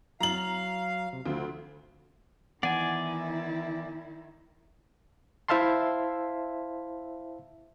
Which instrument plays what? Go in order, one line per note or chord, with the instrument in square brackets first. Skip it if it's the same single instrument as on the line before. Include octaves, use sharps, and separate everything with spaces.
[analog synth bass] F#3 [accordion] F5 [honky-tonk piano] A#5 F#7
[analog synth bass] C3
[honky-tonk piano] D2 [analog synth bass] F3
[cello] D#3 E4 [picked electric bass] E3 B3 [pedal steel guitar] D5 G#5 [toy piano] F#5
[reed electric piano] E4 C5 E5 F5 A5 C6